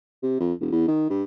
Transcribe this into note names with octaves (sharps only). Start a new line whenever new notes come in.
C3
F2
E1
E2
D#3
G2